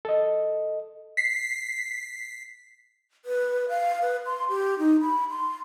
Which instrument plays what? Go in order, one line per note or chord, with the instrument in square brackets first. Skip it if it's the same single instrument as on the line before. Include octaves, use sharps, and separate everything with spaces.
[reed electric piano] A4 D#5
[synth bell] B6 C7
[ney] B4
F5
B4
C6
G4
D#4
B5
C6